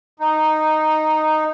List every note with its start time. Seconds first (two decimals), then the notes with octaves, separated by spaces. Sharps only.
0.20 D#4